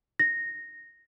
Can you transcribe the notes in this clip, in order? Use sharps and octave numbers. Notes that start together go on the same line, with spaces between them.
A#6